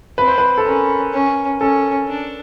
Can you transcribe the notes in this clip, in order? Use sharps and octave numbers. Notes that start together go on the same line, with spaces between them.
C4 B4
C5
B4
A4
C#4 A#4
C#4
C#4 A4
D4